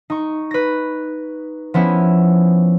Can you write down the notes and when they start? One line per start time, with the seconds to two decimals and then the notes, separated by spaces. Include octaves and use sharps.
0.10 D#4 C#6
0.51 B4 A#6
1.74 F3 B3 C#4 E4